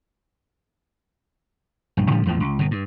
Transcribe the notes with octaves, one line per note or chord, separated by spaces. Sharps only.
A#1 G2
A2 D3 F3 G3
A1 E2 A2 F3
C#2
G1 B2
G2